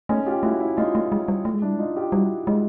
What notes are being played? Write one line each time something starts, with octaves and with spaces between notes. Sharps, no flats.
A3 C#4 D#4
F4 G4
A3 E4 F#4
E4 F#4
A3 D#4 F4
A3
G#3
G3
A3
G#3
G3 D4 E4
G#3
D#4 F4
F4 G4
G3 E4 F#4
G#3 D#4 F4